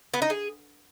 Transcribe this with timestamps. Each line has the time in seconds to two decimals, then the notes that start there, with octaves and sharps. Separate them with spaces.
0.14 B3
0.22 D#4
0.30 G#4